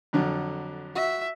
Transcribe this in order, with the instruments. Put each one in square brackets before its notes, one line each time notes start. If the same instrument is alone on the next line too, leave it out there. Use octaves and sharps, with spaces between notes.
[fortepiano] F2 D3 F#3
[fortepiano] F#4 [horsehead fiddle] E5